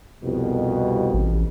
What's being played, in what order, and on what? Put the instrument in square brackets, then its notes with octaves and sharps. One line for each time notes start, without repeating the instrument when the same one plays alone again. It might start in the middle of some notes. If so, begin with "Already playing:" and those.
[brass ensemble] C2 F2 B2
[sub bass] A1